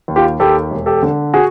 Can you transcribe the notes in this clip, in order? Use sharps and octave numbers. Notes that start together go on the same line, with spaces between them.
D#2
F4 G4
D#2 G4 A4
E1
G4 A4
D3
F#4 G#4